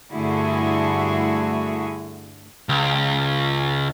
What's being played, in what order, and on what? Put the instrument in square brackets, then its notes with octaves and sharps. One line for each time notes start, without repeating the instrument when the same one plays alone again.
[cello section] G2 D3 A3 E4 F#4 G#4
[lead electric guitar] C#2